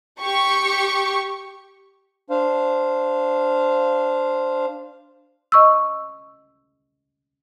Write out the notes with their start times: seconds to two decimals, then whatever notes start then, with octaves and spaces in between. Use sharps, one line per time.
0.22 G4 C#6
2.30 D4 C5 F5
5.52 D#5 C#6 E6